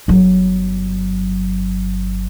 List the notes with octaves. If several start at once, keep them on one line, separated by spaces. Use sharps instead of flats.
G1 F#3